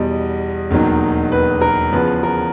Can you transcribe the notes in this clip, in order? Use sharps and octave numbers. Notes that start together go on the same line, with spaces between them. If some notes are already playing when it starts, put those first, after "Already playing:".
Already playing: E2 B2 G3 D#5
E1 D#2 D#3 F#3
B4
A#4
E2 C#3 F3 B4
A#4